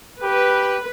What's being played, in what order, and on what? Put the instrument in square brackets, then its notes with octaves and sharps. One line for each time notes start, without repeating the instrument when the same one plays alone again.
[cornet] G4 [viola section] B4